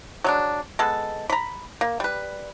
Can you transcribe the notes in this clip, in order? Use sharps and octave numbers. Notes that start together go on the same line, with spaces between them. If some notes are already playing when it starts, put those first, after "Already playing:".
F#3 G#3 D4
G#3 B3 A4
A#5 B5
A#3
G3 B4